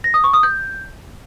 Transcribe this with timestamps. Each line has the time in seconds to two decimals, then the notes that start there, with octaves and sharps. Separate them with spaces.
0.04 A#6
0.14 D#6
0.24 C#6
0.33 D#6
0.43 G6